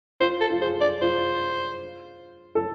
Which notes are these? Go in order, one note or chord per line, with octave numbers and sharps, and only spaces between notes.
F4 C5
A4
F4
G#4 C5
D5
F4 C5
A4